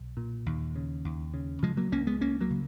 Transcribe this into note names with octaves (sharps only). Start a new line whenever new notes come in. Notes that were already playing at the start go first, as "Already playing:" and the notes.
Already playing: B1
A#2
D#2
C#3
D#2
C#3
C#3 F3 G#3
F#3 A#3
C#2 A#3 C#4
G#3 B3
C#2 A#3 C#4
F#3 A#3
C#3